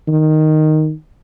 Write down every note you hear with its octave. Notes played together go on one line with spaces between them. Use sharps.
D#3